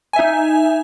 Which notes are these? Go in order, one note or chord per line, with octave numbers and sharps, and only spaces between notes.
D#4 E5 G#5